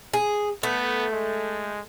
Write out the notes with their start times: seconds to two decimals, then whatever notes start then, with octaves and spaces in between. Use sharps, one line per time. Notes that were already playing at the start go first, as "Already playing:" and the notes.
0.13 G#4
0.63 A3 B3
1.12 G#3